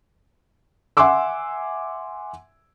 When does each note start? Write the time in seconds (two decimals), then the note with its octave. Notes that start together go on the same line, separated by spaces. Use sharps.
0.97 E5 F#5 G#5 C6 D6 E6